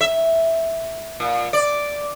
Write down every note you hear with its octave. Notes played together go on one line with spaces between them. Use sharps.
E5
A#2
D5